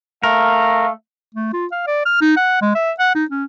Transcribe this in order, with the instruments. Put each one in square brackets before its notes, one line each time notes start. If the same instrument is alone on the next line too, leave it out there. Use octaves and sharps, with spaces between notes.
[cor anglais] A3 [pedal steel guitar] A#4 [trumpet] F5
[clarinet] A3
F4
F5
D5
F6
D#4
F#5
G#3
E5
F#5
D#4
C#4